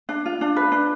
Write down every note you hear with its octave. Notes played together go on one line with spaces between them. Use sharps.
D4
F4
D4
B4
D4